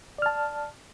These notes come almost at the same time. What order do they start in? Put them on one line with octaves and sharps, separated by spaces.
D5 F6 A5